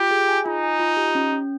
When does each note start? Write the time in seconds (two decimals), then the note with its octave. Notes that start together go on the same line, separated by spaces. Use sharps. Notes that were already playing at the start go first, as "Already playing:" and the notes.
Already playing: F4 G4
0.11 G#4
0.29 G#5
0.46 D#4 F4
0.63 G#5
0.80 F4
0.97 G4
1.15 C#4
1.32 C#4